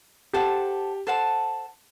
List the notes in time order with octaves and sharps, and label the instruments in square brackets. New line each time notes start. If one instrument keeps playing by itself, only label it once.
[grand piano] G4 [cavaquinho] A4 C5 F#5 A5
[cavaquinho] A4 C5 F#5 A5